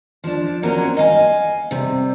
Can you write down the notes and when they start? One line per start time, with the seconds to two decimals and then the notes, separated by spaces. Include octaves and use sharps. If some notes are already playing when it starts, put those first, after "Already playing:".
0.24 F3 D4
0.63 F#3 A#3 C4 C#4 A#4
0.97 D#5 F5 G#5
1.71 C3 G3